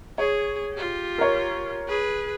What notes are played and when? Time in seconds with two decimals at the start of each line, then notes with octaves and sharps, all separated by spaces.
0.18 G#4 C#5
0.73 F4 G4
1.18 A#4 C#5
1.88 G#4 B4